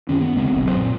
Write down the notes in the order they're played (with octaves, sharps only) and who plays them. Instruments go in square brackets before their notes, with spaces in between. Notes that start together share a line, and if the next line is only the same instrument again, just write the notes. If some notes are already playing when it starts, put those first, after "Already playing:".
[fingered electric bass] F#2 D#3 C#4
B3
D2 C#3 G#3 C4
F1 B1
F#2 B2 C4
A#2